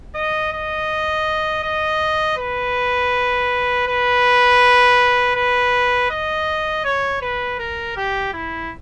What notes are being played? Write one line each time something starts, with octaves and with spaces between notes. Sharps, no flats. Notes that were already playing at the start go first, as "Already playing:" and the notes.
D#5
D#5
D#5
B4
B4
B4
D#5
C#5
B4
A#4
G4
E4